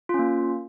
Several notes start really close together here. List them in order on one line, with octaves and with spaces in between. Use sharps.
F4 C#4 A#3